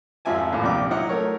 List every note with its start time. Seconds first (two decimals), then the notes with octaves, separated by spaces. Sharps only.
0.25 G#1 F2 F3 E5 G#5 A5
0.52 A1 D#2 A2
0.63 A#1 C3 D5 G5 D6 F6
0.91 F#3 D#4 E4 F#5
1.09 A3 A#4 C#5